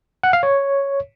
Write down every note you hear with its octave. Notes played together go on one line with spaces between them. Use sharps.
F#5
F5
C#5